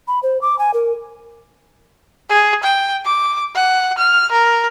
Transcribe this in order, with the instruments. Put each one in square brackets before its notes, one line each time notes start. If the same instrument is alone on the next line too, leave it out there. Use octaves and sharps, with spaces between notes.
[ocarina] B5
C5
D6
G#5
A#4
[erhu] G#4
G5
D6
F#5
F6
A#4